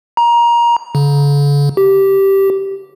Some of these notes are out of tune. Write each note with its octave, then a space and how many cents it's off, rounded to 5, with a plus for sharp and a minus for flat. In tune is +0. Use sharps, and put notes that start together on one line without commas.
A#5 +20
D3 -45
G4 -10